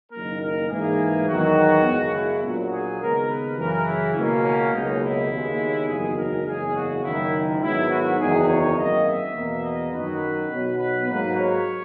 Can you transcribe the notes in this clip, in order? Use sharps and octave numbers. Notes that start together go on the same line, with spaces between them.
F#1 F#2 D#3 A#3 A#4
A#4
G#2 E3 A#3 G#4
E2 D#3 F#3 F#4
F#2 C#3 G#3 B3
E4
A#1 A#2 F#3 F#4
G#4
D#2 C#3 G#3 B3 A#4
B4
F#2 C#3 E3 A#4
E4
C#2 B2 A#3 C#4
C#4
C#2 B2 F#3 A#3 D#4
E4
D#2 C#3 G#3 B3
F#1 E2 D#3 F#3 G#4
A#4
F#1 E2 C#3 G#3 G#4
F#4
F#1 F#2 D#3 E4
G#2 D#3 F#3 B3 E4
F#4
F#1 E2 D#3 G#4
C#5
G#1 F#2 D#3 A#3 D#5
E5
E2 B2 A#3
D#5
F#2 D#3 F#3 B4
B1 B2 F#3 B3
B4
G#2 F#3 A#3 B4
C#5